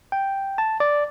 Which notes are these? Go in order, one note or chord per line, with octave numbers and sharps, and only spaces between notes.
G5
A5
D5